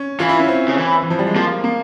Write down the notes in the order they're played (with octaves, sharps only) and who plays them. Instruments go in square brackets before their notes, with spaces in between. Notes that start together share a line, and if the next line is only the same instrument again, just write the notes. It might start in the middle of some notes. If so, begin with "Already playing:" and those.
Already playing: [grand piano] C#4
[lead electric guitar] E3 [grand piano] F4
[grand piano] E4
C#4
C4
[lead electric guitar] C#3
E3
[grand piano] E3
F3
G3
G#3
[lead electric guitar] F3 [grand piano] A#3
[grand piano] A#3